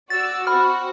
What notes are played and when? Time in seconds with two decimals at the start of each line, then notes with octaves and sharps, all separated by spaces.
0.10 F#4 D5 E6 A6
0.47 C4 F#4 F#5 B5 F6